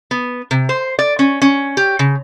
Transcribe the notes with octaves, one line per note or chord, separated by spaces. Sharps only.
B3
C3
C5
D5
C#4
C#4
G4
C#3